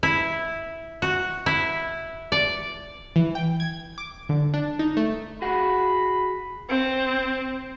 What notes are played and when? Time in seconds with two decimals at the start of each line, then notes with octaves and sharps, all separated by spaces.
0.03 E4
1.02 F#4
1.46 E4
2.32 D5
3.16 E3
3.35 G5
3.60 G#6
3.98 D6
4.29 D3
4.54 D4
4.79 D#4
4.97 A3
5.42 F#4 G#4 F#5 B5
6.69 C4